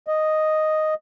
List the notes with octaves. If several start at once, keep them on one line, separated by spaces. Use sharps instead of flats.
D#5